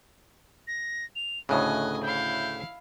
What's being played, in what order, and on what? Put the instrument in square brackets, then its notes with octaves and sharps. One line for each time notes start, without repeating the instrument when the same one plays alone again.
[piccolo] A#6
F7
[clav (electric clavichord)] D2 A2 C#3 [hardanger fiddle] D#5 G#5 [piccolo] F#6
[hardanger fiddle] E4 F5 [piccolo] G6